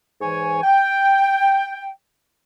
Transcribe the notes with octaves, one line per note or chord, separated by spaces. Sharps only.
G#2 E3 C#5 G#5
G5